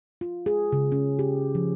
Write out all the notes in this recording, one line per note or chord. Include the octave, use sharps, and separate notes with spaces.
F4
G#4
C#3
C#4
G4
F3